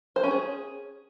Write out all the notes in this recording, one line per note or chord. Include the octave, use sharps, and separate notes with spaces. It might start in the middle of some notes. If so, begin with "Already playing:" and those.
C5
C#4
G#4